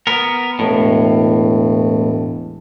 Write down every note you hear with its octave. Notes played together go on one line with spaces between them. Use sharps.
B3 A#4
E1 A2